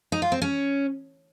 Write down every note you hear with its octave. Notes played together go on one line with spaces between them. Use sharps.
D#4
F4
C4
C#4